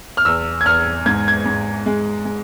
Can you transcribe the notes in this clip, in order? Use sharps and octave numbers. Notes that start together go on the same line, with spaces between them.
F6
E2 E6
G#6
E2 F6
G#2 G#6
G#6
G#2
G#3
G#3